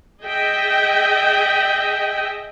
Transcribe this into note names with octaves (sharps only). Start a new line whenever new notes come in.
G#4 D#5 E5 G5